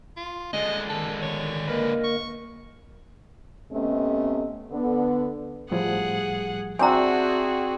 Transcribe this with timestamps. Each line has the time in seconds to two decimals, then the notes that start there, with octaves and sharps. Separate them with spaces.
0.17 F4
0.53 D3 G#3 D#5
0.90 D#3 A4
1.22 C#5
1.67 A#3 A#4 B4 D#5
2.04 C#6
3.71 C3 A3 B3 C#4 D#5
4.70 D3 B3
5.71 A2 F3 G3 G#4 F#5
6.79 C4 D4 F#4 G#4 E5 F#5 G#5 A#5